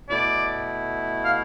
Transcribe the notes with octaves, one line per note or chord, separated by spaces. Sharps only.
B2 A3 E4 D5
F5